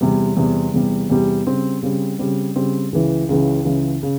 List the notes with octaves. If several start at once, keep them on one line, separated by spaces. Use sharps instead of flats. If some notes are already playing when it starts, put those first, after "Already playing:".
E2 C3 G3
E2 C3 G3
E2 C3 G3
E2 C3 G3
C#3 G3 C4
C#3 G3 C4
C#3 G3 C4
C#3 G3 C4
C#2 C#3 E3
C#2 C#3 E3
C#2 C#3 E3
C#3